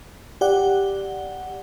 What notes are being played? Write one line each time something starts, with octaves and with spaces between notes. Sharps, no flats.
G4 D5 F#5